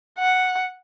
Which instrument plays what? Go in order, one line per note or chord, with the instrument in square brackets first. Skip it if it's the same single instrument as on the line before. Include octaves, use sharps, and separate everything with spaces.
[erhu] F#5